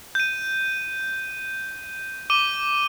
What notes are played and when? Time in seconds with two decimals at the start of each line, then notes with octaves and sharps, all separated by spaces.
0.15 G6 D#7
2.30 D6 D#7 G7